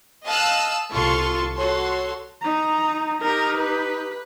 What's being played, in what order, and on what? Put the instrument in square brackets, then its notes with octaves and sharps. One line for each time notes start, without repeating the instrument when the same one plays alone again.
[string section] D#5 F5 A5 E6 F#6
C2 F4 A4 A5 C6 C#6
F#4 A4 C#5 C6
[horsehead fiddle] D#4 A#5
[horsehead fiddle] D#4 G4 [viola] A#4
[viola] B4